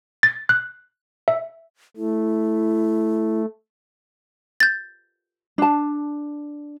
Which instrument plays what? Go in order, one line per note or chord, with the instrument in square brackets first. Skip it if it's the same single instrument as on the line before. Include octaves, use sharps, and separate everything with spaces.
[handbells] A6
F#6
E5
[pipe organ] A3 [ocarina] E4
[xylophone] G6 A6
[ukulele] D4 A5